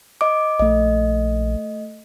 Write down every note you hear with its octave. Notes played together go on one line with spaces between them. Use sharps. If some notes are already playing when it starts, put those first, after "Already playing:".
D#5 D6
A#1 A3 D#5